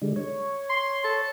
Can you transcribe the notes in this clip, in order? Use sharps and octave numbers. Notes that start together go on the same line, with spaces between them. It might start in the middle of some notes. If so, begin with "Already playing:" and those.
D3 G3 G#3
C#5
C6
A4